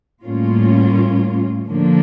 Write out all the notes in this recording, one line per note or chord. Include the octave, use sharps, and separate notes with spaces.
A2 G3 A#3 C#4 F4
D3 F3 A#3 D4